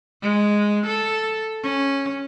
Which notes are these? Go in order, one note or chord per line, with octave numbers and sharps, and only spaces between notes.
G#3
A4
C#4